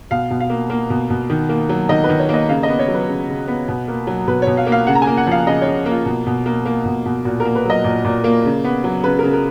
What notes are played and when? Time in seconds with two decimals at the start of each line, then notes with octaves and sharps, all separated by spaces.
0.11 B2 F5
0.30 B2
0.40 F5
0.50 A#3
0.70 A#3
0.90 B2
1.10 B2
1.30 D#3
1.49 A#3
1.69 F#3
1.89 D#3 D#5
2.04 B4
2.09 D#3
2.19 C#5
2.29 A#3 D#5
2.49 C#3 F5
2.63 D#5
2.68 B3
2.79 C#5
2.88 F#3
2.94 B4
3.08 C#3
3.29 C#3
3.48 B3
3.68 B2
3.88 A#3
4.07 F#3
4.27 B2 B4
4.42 C#5
4.47 B2
4.57 F5
4.67 A#3
4.72 F5
4.87 C#3 F#5
4.95 A#5
5.02 G#5
5.07 A#3
5.17 F#5
5.27 F3 F5
5.47 C#3 D#5
5.62 C#5
5.66 C#3
5.86 A#3
5.91 F4
6.05 B2
6.27 B2
6.46 A#3
6.66 A#3
6.85 B2
7.06 B2
7.25 A#2 F#4
7.40 A#4
7.45 A#3
7.55 B4
7.65 F#3 D#5
7.84 A#2
8.05 A#2
8.24 A#3
8.45 C#3
8.65 B3
8.84 F#3
9.04 C#3 B4
9.19 A#4
9.23 C#3
9.33 A#4